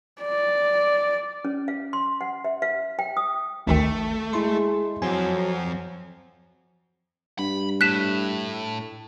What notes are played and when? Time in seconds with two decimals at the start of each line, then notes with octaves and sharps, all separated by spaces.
0.22 D5
1.45 C#4
1.68 F5
1.93 C6
2.21 F#5
2.44 E5
2.62 F5
2.99 G5
3.17 D#6
3.67 G#1 D2 D#3 A3
4.33 G#3 E4 C6
5.02 F2 F#3 C4 G#5
7.39 G2 B5
7.81 A2 F#6 B6 E7